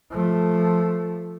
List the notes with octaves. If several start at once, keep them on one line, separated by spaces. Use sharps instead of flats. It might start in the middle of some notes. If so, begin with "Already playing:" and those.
F3 A3